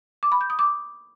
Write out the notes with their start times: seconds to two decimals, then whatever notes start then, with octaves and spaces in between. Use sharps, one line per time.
0.23 D6
0.32 B5
0.41 G6
0.50 D#6
0.59 D6